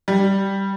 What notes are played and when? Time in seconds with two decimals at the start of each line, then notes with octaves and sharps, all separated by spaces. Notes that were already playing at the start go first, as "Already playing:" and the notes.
0.08 G3